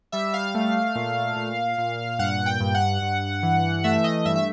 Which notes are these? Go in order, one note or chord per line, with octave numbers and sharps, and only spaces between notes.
G3 E5
F5
A3
A#2
A#2
A#2
G2 F#5
G5
G2
F#5
G2
E3
A3 E5
D#5
G2 E5
E5